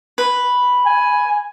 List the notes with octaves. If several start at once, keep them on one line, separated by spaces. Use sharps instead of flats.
B4
G#5